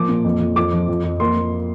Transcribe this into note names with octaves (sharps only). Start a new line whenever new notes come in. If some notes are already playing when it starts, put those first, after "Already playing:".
Already playing: F3 A#3 D6
A#2
F2
F2
F2 D6
F3
F2
F2
A#3 C6
A#3